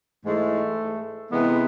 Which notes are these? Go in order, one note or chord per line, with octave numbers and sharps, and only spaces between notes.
G#2 E3 G#3 A3
C3 E3 G#3 B3